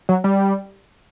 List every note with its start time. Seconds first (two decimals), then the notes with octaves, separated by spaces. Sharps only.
0.09 F#3
0.24 G3